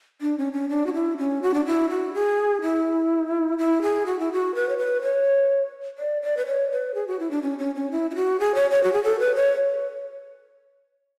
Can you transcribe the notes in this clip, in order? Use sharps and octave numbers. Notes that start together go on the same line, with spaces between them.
D4
C#4
C#4
D4
F#4
E4
C#4
F#4
D4
E4
F#4
G#4
E4
E4
G#4
F#4
E4
F#4
B4
C#5
B4
C#5
D5
D5
B4
C#5
B4
G#4
F#4
E4
D4
C#4
C#4
C#4
E4
E4
F#4
G#4
C#5
C#5
F#4
G#4
A4
B4
C#5